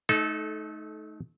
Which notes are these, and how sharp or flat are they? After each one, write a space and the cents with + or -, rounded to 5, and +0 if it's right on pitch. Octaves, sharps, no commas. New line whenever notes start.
A3 -30 D#4 +10 A4 -20